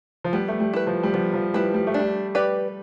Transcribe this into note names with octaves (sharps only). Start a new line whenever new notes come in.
F3
G3 B3
A3
G3
E4 B4
F3
G3
F3 B3
F3
G3 E4 B4
G3
A3
D4
G3
G4 B4 D5